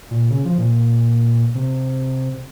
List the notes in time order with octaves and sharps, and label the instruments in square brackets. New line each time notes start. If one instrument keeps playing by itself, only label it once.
[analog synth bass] A#2
C#3
F3
A#2
C3